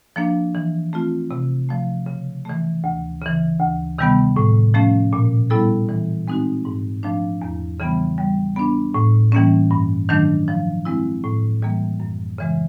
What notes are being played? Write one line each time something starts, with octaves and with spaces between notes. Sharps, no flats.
F3 A#3 D4
E3
A3 C4 F4
C3
F3 A3
C#3
E3 A3
D2
C#3 E3
D2
C3 D#3 G3 B3
A2
F3 A3 C#4
A#2
G3 B3 E4 A4
E3
G#3 C4 D#4 F#4
G#2
F3 A3 D4
E2
C#3 E3 G3 B3
G3
B3 D4
A2
E3 G3 A#3 C#4
G2
D#3 F#3 A3 D4
F3
G#3 C4 E4
A2
E3 G3 A#3
F#2
C#3 E3 G#3